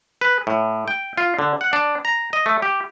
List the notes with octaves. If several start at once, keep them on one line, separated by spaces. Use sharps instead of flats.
B4
A2
G5
F4
D3
F#5
D4
A#5
D#5
A3
G4